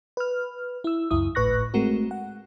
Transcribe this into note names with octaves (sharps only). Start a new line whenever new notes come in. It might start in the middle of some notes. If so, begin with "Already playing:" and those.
B4 F6
E4 E6
C#2 F#2 E4 D#6
G#1 A2 B4 C#6 F#6 A#6
G#3 A3 C4 F#4 A#4
F#5